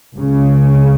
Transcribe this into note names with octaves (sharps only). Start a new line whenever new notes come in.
C#2 C#3